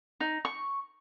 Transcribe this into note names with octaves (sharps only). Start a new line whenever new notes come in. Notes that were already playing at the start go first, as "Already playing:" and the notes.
D#4
C#6